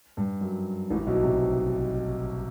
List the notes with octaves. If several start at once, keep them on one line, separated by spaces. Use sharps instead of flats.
G2
F#2
A1 A2
B1 B2
C3